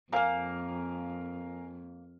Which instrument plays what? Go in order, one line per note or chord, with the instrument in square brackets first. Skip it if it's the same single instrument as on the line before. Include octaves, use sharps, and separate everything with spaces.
[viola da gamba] F2 [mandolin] A#3 C4 [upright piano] A#4 F5 G#5